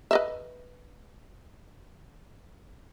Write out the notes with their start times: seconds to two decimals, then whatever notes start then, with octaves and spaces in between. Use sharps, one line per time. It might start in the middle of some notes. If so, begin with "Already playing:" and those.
0.11 B4 D#5 E5